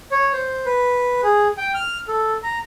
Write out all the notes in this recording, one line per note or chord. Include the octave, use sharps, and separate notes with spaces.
C#5
C5
B4
G#4
G5
F6
A4
A#5